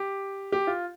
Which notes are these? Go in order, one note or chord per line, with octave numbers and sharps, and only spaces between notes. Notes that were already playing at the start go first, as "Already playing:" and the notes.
Already playing: G4
G4
F4